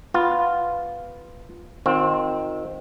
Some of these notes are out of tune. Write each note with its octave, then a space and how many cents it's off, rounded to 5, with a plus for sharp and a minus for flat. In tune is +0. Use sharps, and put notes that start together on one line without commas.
B3 +0 F4 +0
D#3 +0 C4 +0 F4 +45